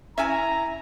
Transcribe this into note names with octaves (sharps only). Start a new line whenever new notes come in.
C#4 E4 E5 G#5 A#5